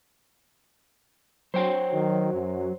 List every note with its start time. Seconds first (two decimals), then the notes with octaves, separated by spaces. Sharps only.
1.54 F#3 C5 C#5 G5
1.93 D#3
2.33 F#2